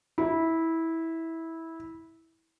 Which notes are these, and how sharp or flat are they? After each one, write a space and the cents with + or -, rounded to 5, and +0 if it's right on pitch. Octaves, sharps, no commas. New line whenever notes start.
E4 -15